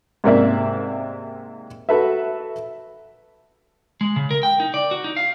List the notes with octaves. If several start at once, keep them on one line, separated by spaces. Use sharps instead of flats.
G#2 C3 A#3 A#4 D5 E5
F#4 A4 B4 E5
G#3
C#3
A#4
G5
D#4
D5
F#4
D#4
F5